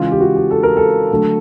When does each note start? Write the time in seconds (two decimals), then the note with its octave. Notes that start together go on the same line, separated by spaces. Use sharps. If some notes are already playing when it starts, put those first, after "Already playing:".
Already playing: C#3 E3 G#3 F4
0.11 G4
0.20 F#4
0.36 G4
0.51 A4
0.63 A#4
0.77 A4
1.11 D3 F#3 A3